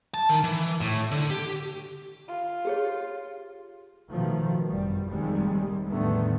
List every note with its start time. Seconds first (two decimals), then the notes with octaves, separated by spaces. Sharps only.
0.14 A5
0.29 D#3
0.44 E3
0.81 A2
1.11 D3
1.30 G4
2.28 F4
2.65 G4 G#4 C#5
4.09 B2 D#3 F3 A3
4.70 G1 F#2 G3
5.09 F1 D#2 C3 D#3 G3 G#3
5.88 E2 A2 D3 D#3 A3 B3